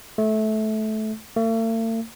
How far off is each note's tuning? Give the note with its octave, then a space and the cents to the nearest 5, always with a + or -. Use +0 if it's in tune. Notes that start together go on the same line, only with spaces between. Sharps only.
A3 -20
A3 +45